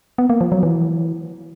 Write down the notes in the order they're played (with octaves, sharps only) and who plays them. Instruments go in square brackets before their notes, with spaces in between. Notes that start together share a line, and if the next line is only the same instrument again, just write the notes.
[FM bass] B3
A#3
F3
F#3
E3